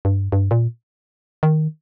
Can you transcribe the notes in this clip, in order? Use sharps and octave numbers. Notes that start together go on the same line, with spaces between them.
G2
G2
A#2
D#3